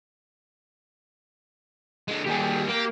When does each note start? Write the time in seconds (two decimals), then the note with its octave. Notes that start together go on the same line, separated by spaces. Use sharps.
2.08 D3 G#3
2.26 D#2 G3 G4 G#4
2.69 A#3 G4